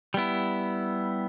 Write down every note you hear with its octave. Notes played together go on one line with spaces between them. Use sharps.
G3 B3 E4